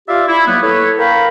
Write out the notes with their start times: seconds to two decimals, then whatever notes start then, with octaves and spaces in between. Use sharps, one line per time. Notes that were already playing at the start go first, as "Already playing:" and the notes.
0.08 F4 G4 D5 E5 F5
0.28 E4
0.47 F#3 A#3 B3
0.62 E4 A4 B4 C#5
0.98 A#4 F5 G5 A#5 B5